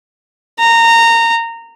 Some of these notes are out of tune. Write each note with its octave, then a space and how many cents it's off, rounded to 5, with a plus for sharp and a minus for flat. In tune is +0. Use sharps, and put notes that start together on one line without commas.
A#5 -20